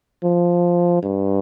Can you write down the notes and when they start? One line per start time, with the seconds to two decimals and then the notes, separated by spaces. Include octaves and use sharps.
0.23 F3
1.03 G2